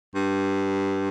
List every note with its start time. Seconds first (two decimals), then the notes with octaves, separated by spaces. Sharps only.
0.15 G2